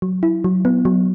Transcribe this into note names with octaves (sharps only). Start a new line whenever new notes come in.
F#3
E4
F#3
B3
F#3